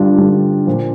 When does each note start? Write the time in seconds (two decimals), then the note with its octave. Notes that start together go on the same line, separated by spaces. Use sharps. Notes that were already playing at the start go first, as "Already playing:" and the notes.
Already playing: G2 D3 G3 D4 F4
0.17 G2 D3 G3
0.67 A#2 F3